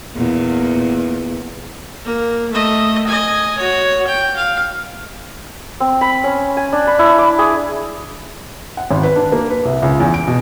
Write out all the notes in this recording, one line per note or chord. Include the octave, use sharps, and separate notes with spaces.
E2 A#2
A#3
A3 D#5
D#5 G#5
F#4 C#5
G5
F5
C4
B5
C#4
G#5
D4
B5
E4
D6
G#4
F#5
G#1
B4
D4
A#3
B4
C2
C#2
E2
D7
B2